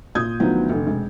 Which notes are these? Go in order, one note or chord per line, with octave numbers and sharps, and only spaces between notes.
A#2 F4 D#6 G6 G#6
D2 D#3 F3 F#3 B3
F1 D3
E1